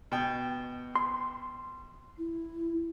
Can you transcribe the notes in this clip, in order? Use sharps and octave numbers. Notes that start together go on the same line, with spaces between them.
B2 G5
C6
E4